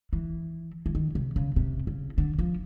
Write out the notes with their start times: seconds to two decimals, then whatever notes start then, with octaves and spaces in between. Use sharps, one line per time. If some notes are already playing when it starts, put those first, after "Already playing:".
0.13 E3
0.86 E3
0.95 D#3
1.15 C3
1.36 C#3
1.56 C3
1.87 C#3
2.18 D3
2.39 F3